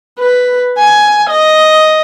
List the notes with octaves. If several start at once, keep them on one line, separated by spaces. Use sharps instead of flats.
B4
G#5
D#5